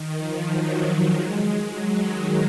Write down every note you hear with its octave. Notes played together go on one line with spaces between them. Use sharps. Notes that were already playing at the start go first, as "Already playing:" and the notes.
Already playing: D#3
F3
F#3
G#3
F#3
D#3